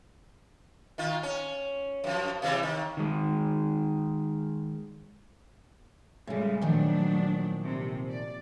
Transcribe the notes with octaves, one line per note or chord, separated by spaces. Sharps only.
D#3 F4
C#4
F#2 F3
C3 E3 G3
D#3
D#3 G#3
A2 C#3 G3 G#3
A#2 D#3 F3 F#3 A3 D4
C3
D5